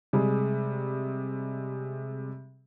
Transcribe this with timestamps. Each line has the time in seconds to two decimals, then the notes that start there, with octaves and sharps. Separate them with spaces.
0.13 C3 G3 G#3 G#4